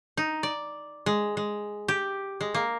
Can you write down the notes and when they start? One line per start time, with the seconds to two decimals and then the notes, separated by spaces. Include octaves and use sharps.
0.17 D#4
0.43 D5
1.06 G#3
1.37 G#3
1.88 G4
2.41 G#3
2.54 A#3